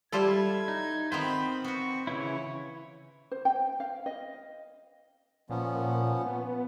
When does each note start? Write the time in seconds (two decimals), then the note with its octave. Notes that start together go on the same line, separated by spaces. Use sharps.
0.12 G3 E4 F4 A4 C5 G#6
0.68 D#4
1.12 D#3 B3 C4 F4 C5 B5
1.64 B3 F#4 C#6
2.07 C#3 E3 E4 C#5
3.32 C5
3.45 G5
3.80 F5
4.06 D#5
5.50 A#2 F3 B3 C#4
6.26 B3